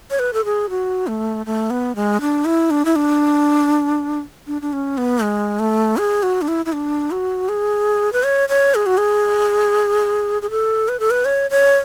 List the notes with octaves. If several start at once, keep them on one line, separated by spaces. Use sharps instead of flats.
C#5
B4
A4
G#4
F#4
A3
A3
B3
G#3
D4
E4
D4
E4
D4
D4
D4
C#4
B3
G#3
A3
G#4
F#4
D4
E4
E4
D4
F#4
G#4
B4
C#5
C#5
G#4
F#4
G#4
G#4
A4
B4
A4
B4
C#5
C#5